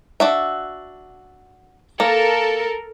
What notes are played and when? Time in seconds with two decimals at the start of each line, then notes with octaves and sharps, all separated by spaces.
0.20 D4 F#4 E5
2.00 A#3 A4 A#4